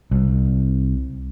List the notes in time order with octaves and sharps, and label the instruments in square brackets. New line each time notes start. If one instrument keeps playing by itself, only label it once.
[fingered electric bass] C2